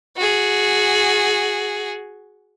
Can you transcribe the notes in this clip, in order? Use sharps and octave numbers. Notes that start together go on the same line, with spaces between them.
F#4 G#4